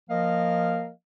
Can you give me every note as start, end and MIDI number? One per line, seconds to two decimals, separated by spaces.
0.10 0.90 53
0.10 0.90 58
0.10 0.90 70
0.10 0.90 75
0.10 0.90 77